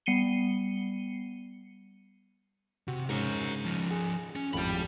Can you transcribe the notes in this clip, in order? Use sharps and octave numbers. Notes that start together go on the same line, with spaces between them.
G3 B3 C7 C#7 D#7 G7
C3 F#4
G#2 C#3 A#4 C#5
F3 C#4
G#4
C#4
G#1 F2 A2 G4 B5